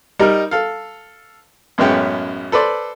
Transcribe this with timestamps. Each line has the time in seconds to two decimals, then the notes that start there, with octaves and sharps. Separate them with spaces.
0.19 G3 D#4 A#4
0.51 A4 F5
1.78 A1 F#2 G#3 B3 C#4 G5
2.52 A4 B4 C5 D5